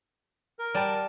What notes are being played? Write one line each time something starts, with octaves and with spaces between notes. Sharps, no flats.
A#4
G3 F#5 A5